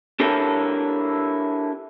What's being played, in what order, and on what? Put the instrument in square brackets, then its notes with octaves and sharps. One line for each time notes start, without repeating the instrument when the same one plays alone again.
[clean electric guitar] D4 E4 G4 A4 A#4 C#5